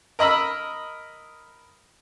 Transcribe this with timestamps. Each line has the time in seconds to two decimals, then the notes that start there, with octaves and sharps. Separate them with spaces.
0.19 A#4 D#5 B5 E6